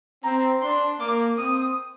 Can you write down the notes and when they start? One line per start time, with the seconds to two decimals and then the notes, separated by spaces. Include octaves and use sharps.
0.24 C4 A#5
0.62 D4 C6
1.00 A#3 D6
1.38 C4 D#6